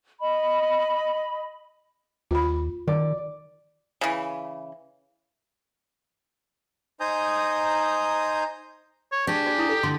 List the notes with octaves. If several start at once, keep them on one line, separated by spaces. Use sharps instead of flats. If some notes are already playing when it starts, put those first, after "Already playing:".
D#5 B5
D#2 F4 B5
D#3 D5
C#3 E3
D#4 C5 G#5 A#5 D#6 G6
C#5
D4 G4 G#4
F#4 D5 G#5
D#4 E4 D#6
A4
D3 C6